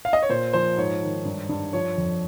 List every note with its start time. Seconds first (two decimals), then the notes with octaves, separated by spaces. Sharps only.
0.05 F5
0.13 D#5
0.23 C#5
0.29 A#2 C5
0.53 F3 C5
0.78 G#2 C#5
1.02 D#3
1.25 G2
1.49 G2
1.73 F3 C#5
1.98 F2